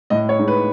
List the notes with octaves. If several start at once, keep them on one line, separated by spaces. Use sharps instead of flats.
A2 D#5
C#5
G#3 D#4
B4